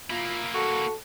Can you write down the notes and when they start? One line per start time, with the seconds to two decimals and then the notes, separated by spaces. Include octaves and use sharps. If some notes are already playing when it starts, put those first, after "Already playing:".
0.10 A#3 E4 F4
0.54 F#4 A4